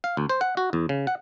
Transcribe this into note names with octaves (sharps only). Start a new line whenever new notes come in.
F5
D2
C5
F#5
F#4
E2
C#3
F#5